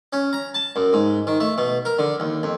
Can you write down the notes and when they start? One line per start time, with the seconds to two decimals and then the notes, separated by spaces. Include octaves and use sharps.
0.13 C#4
0.33 A#5
0.54 A5
0.76 F#2
0.93 G#2
1.27 D#3
1.40 A3
1.58 B2
1.85 A#4
1.99 D3
2.20 D#2
2.43 F2